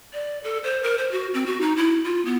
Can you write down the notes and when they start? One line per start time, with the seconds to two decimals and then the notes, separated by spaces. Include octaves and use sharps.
0.13 D5
0.44 A4
0.64 C5
0.83 A#4
0.98 C5
1.11 F#4
1.34 C4
1.46 F#4
1.61 D#4
1.77 E4
2.05 F4
2.25 B3